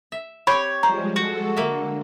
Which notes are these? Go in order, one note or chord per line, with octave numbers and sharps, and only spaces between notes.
E5
C4 G4 C#5 B5
F3 G3 G#3 C5 A#5
G#3 F#4 A4
D3 A#3 E5